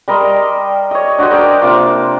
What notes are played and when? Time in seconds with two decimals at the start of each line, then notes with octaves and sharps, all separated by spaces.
0.08 G3 A#4 D#5 C6
0.91 C#5 D#5
1.18 D4 F#4 C5 D#5
1.31 A#4 D5 G5
1.62 C3 A#3 F4 D6